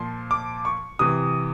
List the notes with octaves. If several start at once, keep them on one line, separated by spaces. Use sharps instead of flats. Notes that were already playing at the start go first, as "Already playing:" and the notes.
Already playing: A#2 F3 C6
D6
C#6
C3 E3 D#6